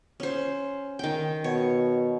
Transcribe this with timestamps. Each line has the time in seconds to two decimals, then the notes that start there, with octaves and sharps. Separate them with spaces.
0.20 C#4 C5
0.99 D#3 G5
1.44 B2 C#5